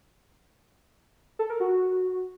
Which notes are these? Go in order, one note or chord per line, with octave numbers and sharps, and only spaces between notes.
A4
A#4
F#4